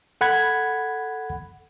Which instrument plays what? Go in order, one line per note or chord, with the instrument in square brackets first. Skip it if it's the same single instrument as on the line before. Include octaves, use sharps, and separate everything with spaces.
[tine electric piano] A4 F#5 B5 G#6